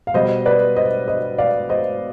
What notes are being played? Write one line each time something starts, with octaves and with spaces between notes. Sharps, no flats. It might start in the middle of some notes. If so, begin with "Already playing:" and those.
F5
B2 G3 C5 D#5
B4 D5
C5 D#5
C5 D#5
D5 F5
C5 D#5